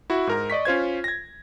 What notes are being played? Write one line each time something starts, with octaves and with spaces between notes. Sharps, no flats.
E4 F#4
G#2 A#4 A#5
D5 D#5 C#6 B6
C#4 F4 C5 G#6
G#6 A#6